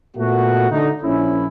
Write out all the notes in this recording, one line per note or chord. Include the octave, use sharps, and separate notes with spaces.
A#2 A3 B3 F#4
D3 A3 D#4
A#1 C#4 E4